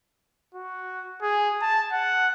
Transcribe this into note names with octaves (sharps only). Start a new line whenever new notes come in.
F#4
G#4
A5
F#5